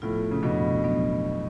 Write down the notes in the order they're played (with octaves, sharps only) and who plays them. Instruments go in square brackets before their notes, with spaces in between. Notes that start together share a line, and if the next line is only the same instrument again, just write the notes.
[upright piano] A2 [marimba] F3 B3 F4
[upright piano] C#3
[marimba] F2 F3 B3 D4 [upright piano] B2
[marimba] F#3 B3 D4